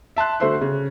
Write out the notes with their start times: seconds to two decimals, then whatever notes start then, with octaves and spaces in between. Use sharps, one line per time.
0.16 E5 A5 C6 F#6
0.40 D3 A3 F#4 C5 E5 C6
0.61 C#3